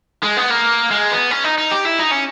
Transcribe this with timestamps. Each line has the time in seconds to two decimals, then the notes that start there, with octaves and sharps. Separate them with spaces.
0.24 G#3
0.37 B3
0.50 A#3
0.91 G#3
1.11 B3
1.31 C#4
1.44 D#4
1.58 D#4
1.71 G4
1.85 E4
1.99 D#4
2.11 C#4